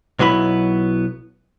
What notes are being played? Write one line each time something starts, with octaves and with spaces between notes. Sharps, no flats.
B1 F#3 B3 E4 B5